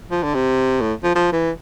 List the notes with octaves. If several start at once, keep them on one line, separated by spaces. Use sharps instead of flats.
F3
D3
C3
A2
F3
F3
E3